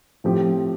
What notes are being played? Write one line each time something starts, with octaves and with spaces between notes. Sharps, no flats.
A2 F3 C4 G4